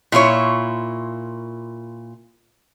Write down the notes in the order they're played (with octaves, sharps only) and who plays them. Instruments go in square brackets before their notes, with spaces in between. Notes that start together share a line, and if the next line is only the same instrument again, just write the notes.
[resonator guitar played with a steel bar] A#2 E4 F4 C#5